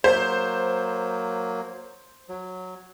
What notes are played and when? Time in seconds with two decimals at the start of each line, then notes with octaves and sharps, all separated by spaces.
0.04 F#3 A#3 C5
2.29 F#3